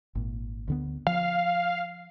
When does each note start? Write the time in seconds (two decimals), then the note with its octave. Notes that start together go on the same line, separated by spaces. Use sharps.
0.15 G#1 A#2
0.68 D2 D3 B3
1.07 F3 F5